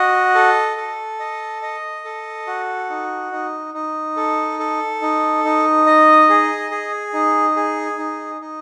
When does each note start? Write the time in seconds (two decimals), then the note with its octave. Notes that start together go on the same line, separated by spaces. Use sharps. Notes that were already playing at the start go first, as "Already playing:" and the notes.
Already playing: F#4 D#5
0.35 A4
0.77 A4
1.19 D#5
1.62 D#5
2.04 A4
2.47 F#4
2.89 D#4
3.32 D#4
3.74 D#4
4.17 A4
4.59 A4
5.02 D#4
5.44 D#4
5.86 D#5
6.29 G#4
6.71 G#4
7.14 D#4
7.56 G#4
7.98 D#4
8.41 D#4